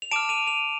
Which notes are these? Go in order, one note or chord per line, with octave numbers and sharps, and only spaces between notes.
F7
A5 D6 F6 D7 E7
D#7 F7
D#7 F7